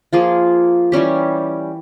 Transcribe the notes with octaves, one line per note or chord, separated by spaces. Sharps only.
F3 A#3 F4 G#4
E3 G3 C#4 G4